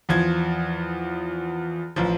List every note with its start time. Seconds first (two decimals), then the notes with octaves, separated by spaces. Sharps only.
0.09 E2 F3 G#6
1.96 A1 F3